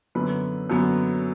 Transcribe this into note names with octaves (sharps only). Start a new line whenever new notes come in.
F#2 D3 F#3 B3 B4
F#2 D3 F#3 B3